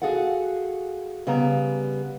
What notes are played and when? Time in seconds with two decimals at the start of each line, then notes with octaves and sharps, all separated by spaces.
0.02 F#4 G#4 A4 F5 F#5
1.27 C#3 G3 B3 A#5